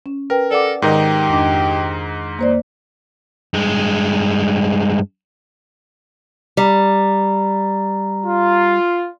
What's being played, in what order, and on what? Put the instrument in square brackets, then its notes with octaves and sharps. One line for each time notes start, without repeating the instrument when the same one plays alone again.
[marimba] C#4
[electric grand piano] A#4 [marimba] B4 G5
[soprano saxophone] A4 [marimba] D5 F#5 D6
[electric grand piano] G#2 D#4 D#5 [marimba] D#3 A#4 [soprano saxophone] G4
[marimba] F2 D4 D6
A#3 C5 D5
[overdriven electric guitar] G2 G#3
[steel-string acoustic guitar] G3 [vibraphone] A#5
[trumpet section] F4